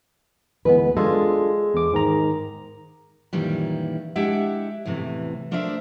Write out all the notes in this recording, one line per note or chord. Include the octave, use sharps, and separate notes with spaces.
D2 E3 G#3 B3 B4
G#3 D4 F4 A4
E2 D6
G#2 D#3 A#5
F#2 A#2 D#3 E3 G3
G#3 D4 E4 G4 E5 F#5
E2 A2 C3 E3
A3 D4 A#4 C5 D5 E5